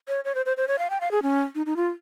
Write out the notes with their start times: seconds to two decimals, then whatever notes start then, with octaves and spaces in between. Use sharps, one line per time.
0.08 C#5
0.25 C#5
0.35 C5
0.46 C5
0.57 C5
0.68 C#5
0.79 F5
0.90 G5
1.01 F5
1.11 G#4
1.23 C#4
1.55 D#4
1.66 D#4
1.76 F4